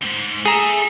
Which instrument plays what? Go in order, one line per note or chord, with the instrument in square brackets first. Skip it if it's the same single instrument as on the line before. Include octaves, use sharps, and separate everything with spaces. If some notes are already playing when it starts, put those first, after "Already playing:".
[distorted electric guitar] D2 G#2
[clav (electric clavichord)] G#4 A#5 [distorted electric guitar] A4 E5